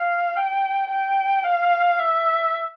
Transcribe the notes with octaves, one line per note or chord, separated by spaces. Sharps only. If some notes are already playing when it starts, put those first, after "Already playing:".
Already playing: F5
G5
G5
F5
E5